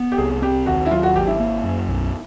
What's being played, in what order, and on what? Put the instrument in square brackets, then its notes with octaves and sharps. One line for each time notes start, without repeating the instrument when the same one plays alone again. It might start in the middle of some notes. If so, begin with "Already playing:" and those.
Already playing: [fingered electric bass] B3
[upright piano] G4
[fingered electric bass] C2 [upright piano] G#4
[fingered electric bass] C4 [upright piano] G4
[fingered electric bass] D#2 [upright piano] F#4
[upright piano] E4
[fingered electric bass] F#3 [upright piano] F4
[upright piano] F#4
[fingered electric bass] G#1 [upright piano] G4
[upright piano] E4
[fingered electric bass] A#3
F#2
B1